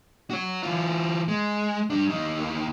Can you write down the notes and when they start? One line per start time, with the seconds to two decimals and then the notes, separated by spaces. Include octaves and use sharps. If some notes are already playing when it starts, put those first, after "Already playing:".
0.30 F#4 C#5
0.63 E3 F4
1.28 G#3
1.90 G3 D4
2.10 D#2 D#4